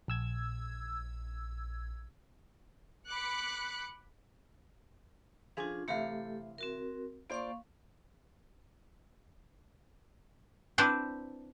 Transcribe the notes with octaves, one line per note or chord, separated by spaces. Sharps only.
A#1 E6 G#6
B5 D6 F#6 C#7
F3 C#4 D4 F4 G#4
C3 E3 A3 G4 A4 F5
C4 F#4 A#4
A#3 F4 C5 D5 F5 C#6
C4 D4 E4 B4 C5